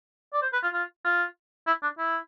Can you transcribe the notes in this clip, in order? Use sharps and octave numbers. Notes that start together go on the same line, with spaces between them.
D5
C5
B4
F4
F4
F4
E4
D4
E4